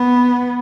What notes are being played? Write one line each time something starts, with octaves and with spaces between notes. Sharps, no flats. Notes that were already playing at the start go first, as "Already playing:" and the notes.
Already playing: B3